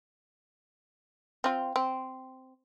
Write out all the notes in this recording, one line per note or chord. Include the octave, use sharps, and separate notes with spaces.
C4 F4
C4